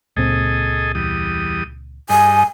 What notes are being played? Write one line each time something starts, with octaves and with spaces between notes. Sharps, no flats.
C#2 A#2 C4 G#4 A4 D#5
E2 G3 D#6
G2 D#5 G#5